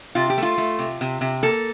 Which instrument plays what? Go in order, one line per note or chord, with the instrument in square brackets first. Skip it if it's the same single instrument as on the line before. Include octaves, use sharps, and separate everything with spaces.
[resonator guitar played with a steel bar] C3 F4
G4
A3
F4
A3
C3
C3
C3
A#3 A4